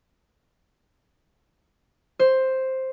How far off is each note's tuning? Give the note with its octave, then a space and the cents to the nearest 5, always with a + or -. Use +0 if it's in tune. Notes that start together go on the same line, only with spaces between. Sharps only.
C5 +5